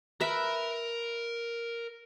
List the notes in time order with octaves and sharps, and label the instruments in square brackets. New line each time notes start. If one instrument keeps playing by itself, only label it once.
[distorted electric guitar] A#4 A#5 [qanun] B4 E5 B5